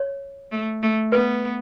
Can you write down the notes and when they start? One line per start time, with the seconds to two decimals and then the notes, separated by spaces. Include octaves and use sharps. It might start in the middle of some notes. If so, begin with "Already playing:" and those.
Already playing: C#5
0.52 A3
0.83 A3
1.12 B3 B4